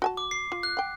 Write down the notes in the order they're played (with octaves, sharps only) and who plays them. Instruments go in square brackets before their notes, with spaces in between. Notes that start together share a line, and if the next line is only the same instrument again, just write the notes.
[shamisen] F#4 G#5 A5
[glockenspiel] D6
C7
[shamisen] F4
[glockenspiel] F#6
[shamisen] F#5 G5